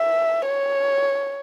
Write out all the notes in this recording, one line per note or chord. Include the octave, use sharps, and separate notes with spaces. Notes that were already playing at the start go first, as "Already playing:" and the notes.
Already playing: E5
C#5